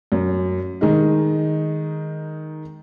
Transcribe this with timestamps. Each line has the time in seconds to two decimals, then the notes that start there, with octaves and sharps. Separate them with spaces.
0.12 F#2
0.81 D#3 G#3 D#4